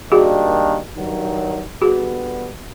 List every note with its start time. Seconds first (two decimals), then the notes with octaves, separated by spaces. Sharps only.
0.12 D#3 G3 A#3 D4 F#4 G#4
0.96 G2 D#3 F#3
1.82 D3 G3 B3 F#4 G#4